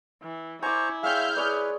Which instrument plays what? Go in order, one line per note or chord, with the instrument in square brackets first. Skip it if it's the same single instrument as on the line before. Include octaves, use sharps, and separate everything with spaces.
[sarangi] E3
[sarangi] E4 [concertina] C5 A#5 C#6 [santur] G#5 D6
[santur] G#3 C#5 G5 [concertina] E5 F5 [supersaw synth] F6 G6
[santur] G#4 C#5 D5 [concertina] B4